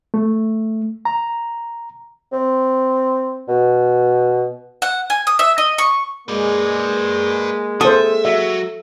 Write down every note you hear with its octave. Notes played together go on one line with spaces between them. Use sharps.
A3
A#5
C4
B2
F#5
G#5
D#6
E5
D#5
C#6
G#3 A#3 B4 D5
A4 C5 E5 D#6
F#3 E5